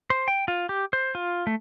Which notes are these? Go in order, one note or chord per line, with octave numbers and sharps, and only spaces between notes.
C5
G5
F4
G4
C5
F4
A3